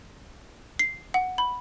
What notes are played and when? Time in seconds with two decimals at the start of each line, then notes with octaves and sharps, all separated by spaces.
0.79 C7
1.14 F#5
1.38 B5